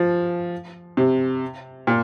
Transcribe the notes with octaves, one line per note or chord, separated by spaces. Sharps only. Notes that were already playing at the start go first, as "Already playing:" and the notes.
Already playing: F3
C3
A#2